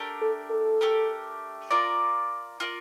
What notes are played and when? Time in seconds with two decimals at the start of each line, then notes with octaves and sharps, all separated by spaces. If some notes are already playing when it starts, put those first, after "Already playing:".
Already playing: A3 D4 G4 A#4
0.21 A4
0.51 A4
0.81 A3 D4 G4 A#4
1.71 F4 A#4 D5
2.60 F4 A#4 D5